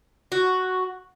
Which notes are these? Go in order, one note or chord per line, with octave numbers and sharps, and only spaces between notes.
F#4